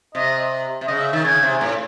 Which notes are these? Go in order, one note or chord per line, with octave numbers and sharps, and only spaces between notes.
C3 D#5
C3
C#3 D#5
E5
D#3 E5
C#3 G#5
C3
A2